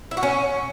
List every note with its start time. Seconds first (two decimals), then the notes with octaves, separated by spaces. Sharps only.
0.11 E4
0.17 F#4
0.23 C#4